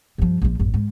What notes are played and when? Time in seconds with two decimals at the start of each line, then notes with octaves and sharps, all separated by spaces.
0.18 G2 F3
0.42 A#1 F3
0.60 A1 F#2
0.74 G#2